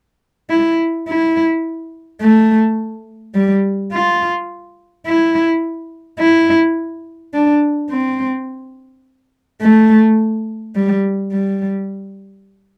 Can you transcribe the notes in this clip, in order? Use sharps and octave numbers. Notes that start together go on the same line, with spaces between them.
E4
E4
A3
G3
F4
E4
E4
D4
C4
A3
G3
G3